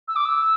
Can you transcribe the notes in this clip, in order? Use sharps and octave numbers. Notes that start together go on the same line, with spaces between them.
E6
D6
E6